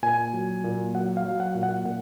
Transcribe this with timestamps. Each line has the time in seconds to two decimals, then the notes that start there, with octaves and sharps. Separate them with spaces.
0.02 A#2 G#5
0.33 F#3
0.64 A#2
0.94 F#3 F#5
1.17 F5
1.24 F#3
1.34 F5
1.40 F#5
1.55 A#2
1.63 F#5
1.85 A#2 F#5